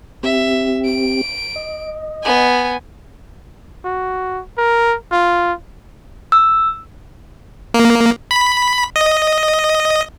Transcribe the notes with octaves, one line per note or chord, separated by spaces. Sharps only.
C4 G4 E5
D7
D#5
B3 G#5
F#4
A#4
F4
E6
A#3
B5
D#5